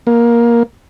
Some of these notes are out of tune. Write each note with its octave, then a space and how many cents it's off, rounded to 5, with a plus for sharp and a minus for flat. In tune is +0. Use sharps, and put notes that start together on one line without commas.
A#3 +15